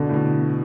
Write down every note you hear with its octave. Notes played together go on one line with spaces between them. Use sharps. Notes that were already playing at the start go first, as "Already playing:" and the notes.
Already playing: B2 D3
A2
B2